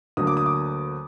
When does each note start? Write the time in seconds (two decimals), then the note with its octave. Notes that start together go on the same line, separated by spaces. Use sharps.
0.17 D2 D3 F#3 A#3 D#6
0.27 D6
0.37 D#6
0.46 D6